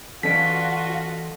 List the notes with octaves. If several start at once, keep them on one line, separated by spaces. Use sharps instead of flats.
E3 C#4 F4 F#4 A4 D5 D#5 B6